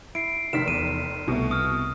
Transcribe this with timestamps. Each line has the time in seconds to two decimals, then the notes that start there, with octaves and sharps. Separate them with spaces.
0.15 E4 C7 D7
0.53 F1 D#3 B6 E7
0.68 E2 D#7
1.28 C2 B2 A3
1.51 D#6 F6